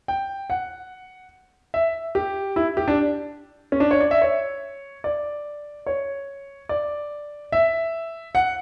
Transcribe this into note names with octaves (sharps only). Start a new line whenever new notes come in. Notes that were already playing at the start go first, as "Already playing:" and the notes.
G5
F#5
E5
G4
E4
G4
D4
C#4
D4
C#5
D5
E5
C#5
D5
C#5
D5
E5
F#5